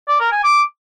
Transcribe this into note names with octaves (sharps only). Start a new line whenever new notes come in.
D5
A#4
G#5
D6